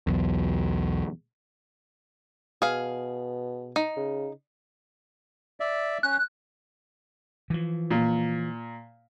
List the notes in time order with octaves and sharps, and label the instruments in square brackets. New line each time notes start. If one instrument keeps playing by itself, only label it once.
[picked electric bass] B1 E2
[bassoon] B2 [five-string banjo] G#4 F5
[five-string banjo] D#4
[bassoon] C#3
[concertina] D5 E5
[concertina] C#4 [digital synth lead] F#6
[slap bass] E3 F3
[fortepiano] A#2